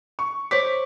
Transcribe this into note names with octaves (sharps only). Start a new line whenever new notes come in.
C#6
C5 C#5 C#6 D6 B6